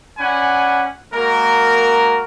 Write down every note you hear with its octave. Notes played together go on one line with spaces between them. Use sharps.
C#4 D5 F#5 G#5 B5
G#3 A#3 F#4 A#4